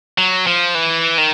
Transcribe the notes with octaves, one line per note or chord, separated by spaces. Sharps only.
F#3
F3
E3
D#3